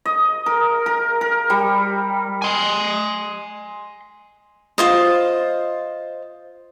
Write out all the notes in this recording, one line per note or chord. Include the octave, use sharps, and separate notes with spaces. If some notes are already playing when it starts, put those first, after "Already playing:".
D#5
A#4
A#4
A#4
G3
G#5 C6
F4 C5 D#5